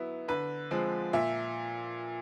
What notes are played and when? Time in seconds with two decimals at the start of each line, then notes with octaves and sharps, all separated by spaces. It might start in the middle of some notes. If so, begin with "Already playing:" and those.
Already playing: F#3 B3 E4
0.28 D3 B4
0.71 F3 G#3 C4
1.13 A#2 E5